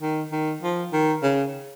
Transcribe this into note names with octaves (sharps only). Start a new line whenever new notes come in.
D#3
D#3
F3
D#3
C#3